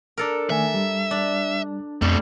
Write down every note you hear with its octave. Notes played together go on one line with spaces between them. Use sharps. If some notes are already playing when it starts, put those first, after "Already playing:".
D4 A4 A#4
D#3 A3 E5 G#5
G3
D4
F2 B2 G3 A3